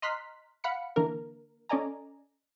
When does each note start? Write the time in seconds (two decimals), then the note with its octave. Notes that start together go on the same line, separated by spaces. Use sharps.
0.02 D#5 A#5 C6 F6 F#6 B6
0.64 F5 F#5 B5 C#7
0.96 D3 E3 A#3 D4 A#4
1.69 C#4 A4 D5 D#5 G#5 A#5